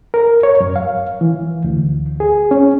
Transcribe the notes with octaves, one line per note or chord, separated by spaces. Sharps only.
A#4
C#5
F#2
F5
E3
D2
G#4
C#4